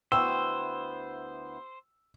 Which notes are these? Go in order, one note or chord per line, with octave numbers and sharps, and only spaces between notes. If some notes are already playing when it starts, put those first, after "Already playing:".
D2 B3 E4 C5 G5 B5 C#6 E6